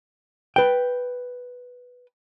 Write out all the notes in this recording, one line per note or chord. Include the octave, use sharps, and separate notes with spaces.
B4 G5